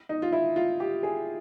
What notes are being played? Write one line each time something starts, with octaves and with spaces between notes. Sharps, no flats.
D#4
F4
E4
F4
G4
G#4